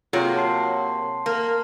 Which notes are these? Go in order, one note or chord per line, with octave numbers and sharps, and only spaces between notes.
C3 F#3 A#3 F4 G#4 C#5
A5 C6 C7
A#3 A#4